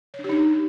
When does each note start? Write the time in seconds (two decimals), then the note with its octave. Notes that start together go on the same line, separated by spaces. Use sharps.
0.14 C#5
0.19 D4
0.24 G4
0.29 D#4